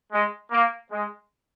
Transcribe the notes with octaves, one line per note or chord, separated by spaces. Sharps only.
G#3
A#3
G#3